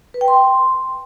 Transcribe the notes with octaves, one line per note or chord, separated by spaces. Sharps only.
B4
G5
C6